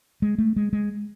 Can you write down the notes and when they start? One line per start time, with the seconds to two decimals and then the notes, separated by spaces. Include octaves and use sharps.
0.22 G#3
0.38 A3
0.56 G#3
0.73 G#3